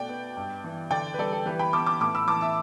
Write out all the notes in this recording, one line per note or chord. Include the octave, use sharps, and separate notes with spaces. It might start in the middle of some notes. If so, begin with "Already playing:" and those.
Already playing: B2 A3 D5 G5
B3
G2
E3
D3 D5 G5
B4
G3 A4 D5
A4
E3 G4 B4
G5 B5
B3 A5 D6
A5 D6
A2 A5 D6
B5 E6
E3 A5 D6
E5 A5